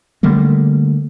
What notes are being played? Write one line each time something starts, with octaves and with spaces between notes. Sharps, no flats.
D3 G3 A3 A#3